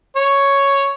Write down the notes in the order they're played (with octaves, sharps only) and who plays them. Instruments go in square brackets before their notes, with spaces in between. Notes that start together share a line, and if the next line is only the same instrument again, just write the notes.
[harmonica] C#5